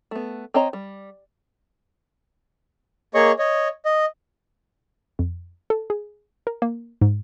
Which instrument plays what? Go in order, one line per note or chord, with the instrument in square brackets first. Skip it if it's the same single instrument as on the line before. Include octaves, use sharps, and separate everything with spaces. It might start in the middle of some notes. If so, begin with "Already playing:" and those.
[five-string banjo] A3 B3
C4 C#5 D#5 A#5
G3
[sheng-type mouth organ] A#3 G#4 C#5 D#5 C#6
C#5 D#5
D#5
[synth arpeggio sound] F2
A4
G#4
A#4
A#3
G#2